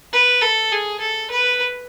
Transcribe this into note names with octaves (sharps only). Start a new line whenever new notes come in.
B4
A4
G#4
A4
B4